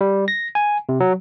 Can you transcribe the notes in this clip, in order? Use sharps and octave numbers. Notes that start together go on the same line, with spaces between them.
G3
A#6
G#5
C3
F#3